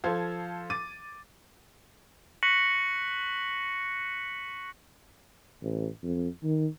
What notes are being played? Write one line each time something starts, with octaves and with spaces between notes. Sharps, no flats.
F3 A4 C5 F5 G#6
D6 A6 D#7
C#6 F#6 A#6 B6 C#7 F#7
A1
F2
D#3